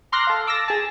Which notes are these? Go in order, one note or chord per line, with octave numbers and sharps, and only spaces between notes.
A#5 C6 D6 F6 F#6 A#6
A4 F5
D6 E6 A6 A#6
G#4 A5